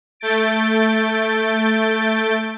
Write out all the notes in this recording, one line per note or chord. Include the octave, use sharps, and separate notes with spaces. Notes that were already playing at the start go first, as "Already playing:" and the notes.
A3 G6 A6 D7